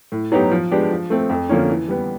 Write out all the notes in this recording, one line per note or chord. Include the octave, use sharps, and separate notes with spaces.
A2
F#3 B3 D#4 G4
F3
G#3 B3 D4 G4
F3
A3 C4
F2
D3 F3 A#3 C#4
E3
G3 B3